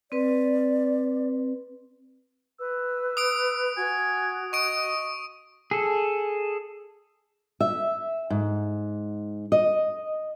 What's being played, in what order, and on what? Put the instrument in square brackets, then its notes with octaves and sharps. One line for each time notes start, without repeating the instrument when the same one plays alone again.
[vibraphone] C4 B4 [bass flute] D5
[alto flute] B4 [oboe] E6
[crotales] D#6 D7
[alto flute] F#4 [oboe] G#5
[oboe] D#5 [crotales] C#6 D7
[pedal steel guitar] G#4 A4
[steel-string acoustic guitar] E5
G#2
D#5